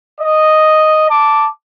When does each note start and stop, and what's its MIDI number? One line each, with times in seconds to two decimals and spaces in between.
0.20 1.06 75
1.09 1.47 81
1.09 1.47 86